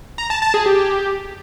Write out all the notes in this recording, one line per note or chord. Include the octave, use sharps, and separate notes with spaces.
A#5
A5
A5
G#4
G4